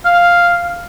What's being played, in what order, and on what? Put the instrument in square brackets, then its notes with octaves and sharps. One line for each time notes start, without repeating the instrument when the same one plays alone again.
[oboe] F5